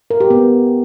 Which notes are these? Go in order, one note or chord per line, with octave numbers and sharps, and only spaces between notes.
A#4
G4
B3